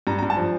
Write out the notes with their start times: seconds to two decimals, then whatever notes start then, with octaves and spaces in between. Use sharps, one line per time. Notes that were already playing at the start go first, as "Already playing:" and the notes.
0.07 G2 A#5
0.19 A#5
0.23 G2
0.30 A5
0.37 F3